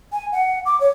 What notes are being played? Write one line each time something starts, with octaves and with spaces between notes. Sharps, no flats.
G#5
F#5
D6
C#5